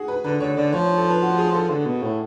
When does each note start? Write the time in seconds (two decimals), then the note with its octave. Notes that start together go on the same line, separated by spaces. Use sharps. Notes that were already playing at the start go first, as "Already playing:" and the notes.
Already playing: F#4 G#4
0.08 B4
0.24 D3 B4
0.40 D3 C#5
0.57 D3 D5
0.73 F3 C#5
0.85 C#5
0.97 A4
1.09 B4
1.22 F#4
1.38 G#4
1.54 A4
1.70 D3
1.86 B2
2.02 A2